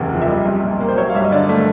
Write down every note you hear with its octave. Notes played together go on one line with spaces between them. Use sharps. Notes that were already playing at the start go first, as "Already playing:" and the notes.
Already playing: F#1 E2 C3 A#3 F#5
F3
E5
G3 D#5
C2
A#2
A#3
C5
F#3 C#5
F5
G2 E5
D#5
D3 D5
A3